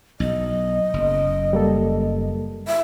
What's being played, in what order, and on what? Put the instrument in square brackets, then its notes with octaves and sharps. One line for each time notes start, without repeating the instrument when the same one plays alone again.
[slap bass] B1 [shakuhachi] D#5
[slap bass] F#1
[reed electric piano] G3 A#3 A4
[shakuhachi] E5